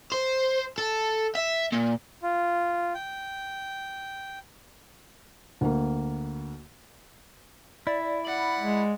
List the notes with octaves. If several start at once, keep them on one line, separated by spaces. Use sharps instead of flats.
C5
A4
E5
A#2
F4
G5
D2 A#3
E4 D5
D5 F#5 B5
G#3